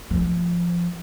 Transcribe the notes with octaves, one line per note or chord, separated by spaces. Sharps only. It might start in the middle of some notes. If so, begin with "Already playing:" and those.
F3